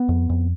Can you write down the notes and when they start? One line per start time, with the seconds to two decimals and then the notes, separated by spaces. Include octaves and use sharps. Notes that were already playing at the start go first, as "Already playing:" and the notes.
Already playing: B3
0.09 F2
0.30 F2